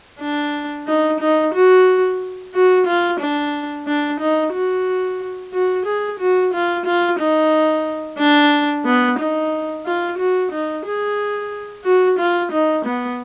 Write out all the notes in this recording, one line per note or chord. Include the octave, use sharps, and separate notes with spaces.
D4
D#4
D#4
F#4
F#4
F4
D4
D4
D#4
F#4
F#4
G#4
F#4
F4
F4
D#4
D4
B3
D#4
F4
F#4
D#4
G#4
F#4
F4
D#4
B3